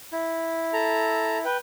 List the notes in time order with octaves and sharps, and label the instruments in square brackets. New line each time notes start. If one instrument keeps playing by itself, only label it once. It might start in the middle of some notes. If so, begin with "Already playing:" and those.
[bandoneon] E4
[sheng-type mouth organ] A4 A#5
B4 G5